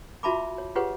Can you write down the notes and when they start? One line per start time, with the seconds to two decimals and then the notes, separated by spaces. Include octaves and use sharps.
0.23 F4 F#4 E5 A5 B5 D6
0.58 C#5
0.75 F4 G4 G#4 B4 C#5 F#5